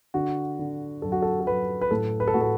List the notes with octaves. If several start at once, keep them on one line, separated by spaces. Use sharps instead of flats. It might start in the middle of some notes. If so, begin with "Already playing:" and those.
D3 F#4
D3
F#2 A4
F#4
A4
A4
F#2 B4
B4
A2 A4
B4
A4
A2 F#4
A4